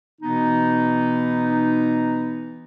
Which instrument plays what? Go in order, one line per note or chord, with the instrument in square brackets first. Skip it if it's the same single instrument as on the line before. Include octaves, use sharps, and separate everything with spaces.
[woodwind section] B2 E3 B3 D#4